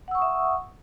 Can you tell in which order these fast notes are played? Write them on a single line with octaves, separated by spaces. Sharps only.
F#5 E6 C#6 D#6 E5